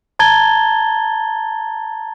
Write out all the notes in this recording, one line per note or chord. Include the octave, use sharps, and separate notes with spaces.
A5 A#5 G#6 A6 G7